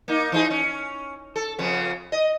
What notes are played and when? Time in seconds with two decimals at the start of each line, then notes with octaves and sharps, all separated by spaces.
0.08 A#3 D#4
0.32 E3 D#4 G#4
0.51 C#4
1.36 A4
1.58 F2 C#3 B3
2.12 D#5